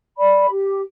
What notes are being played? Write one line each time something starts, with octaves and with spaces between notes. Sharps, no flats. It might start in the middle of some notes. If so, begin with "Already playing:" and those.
D5 B5
G4